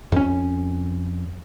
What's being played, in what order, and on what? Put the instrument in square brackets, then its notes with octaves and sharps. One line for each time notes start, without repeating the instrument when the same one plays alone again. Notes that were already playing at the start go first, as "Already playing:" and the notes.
[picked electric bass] F2 C#4